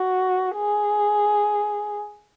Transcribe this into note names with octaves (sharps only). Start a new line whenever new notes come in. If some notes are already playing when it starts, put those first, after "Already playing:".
Already playing: F#4
G#4